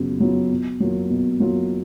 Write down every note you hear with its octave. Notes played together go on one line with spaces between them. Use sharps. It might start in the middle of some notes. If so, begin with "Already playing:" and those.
Already playing: C#3 F#3 B3 F4
F#3 B3 F4
B2
F#3 A#3 F4
B2
F#3 A#3 F4